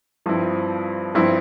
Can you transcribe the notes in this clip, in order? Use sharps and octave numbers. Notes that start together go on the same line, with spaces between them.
G2 F3 C4 E4
G2 F3 C4 E4